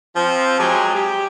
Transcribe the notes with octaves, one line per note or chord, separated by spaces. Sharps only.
F3 C4
F#3 G#3 G4 G#4 G#5 A#5
G4